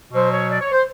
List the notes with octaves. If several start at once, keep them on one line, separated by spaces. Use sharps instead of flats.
B2 F#3 C5
C#5
D5
C#5
C5